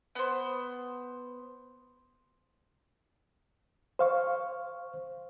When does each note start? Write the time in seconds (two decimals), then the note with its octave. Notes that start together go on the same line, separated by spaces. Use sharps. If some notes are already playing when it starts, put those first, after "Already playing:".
0.15 B3 C5
3.99 C5 F5 C#6